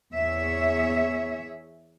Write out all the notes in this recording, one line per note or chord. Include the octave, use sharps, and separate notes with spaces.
E2 G#4 C#5 E5